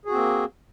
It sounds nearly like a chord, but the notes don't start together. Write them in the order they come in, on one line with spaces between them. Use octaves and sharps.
G#4 F#4 C4 A#3